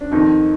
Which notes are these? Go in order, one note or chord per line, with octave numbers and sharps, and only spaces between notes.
D4
F2 D#3 D#4